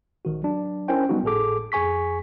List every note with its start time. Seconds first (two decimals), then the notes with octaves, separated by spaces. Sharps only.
0.25 A#1 D#3 F#4
0.42 F#3 D4
0.88 C#4 E4 A#4 C5 G5 G#5
1.09 F#3 G3 B3 D#4 F#4
1.23 G#1 A2 G#4 A4 D6
1.72 F2 G#4 G#5 C#6 B6